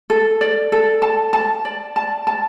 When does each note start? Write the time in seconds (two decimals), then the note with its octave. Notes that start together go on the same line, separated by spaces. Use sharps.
0.10 A4
0.41 D5
0.72 A4
1.02 A5
1.33 A5
1.65 D5
1.96 A5
2.27 A5